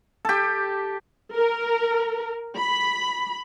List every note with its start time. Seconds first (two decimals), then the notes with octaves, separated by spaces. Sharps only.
0.25 G4 A4
1.35 A#4
2.57 B5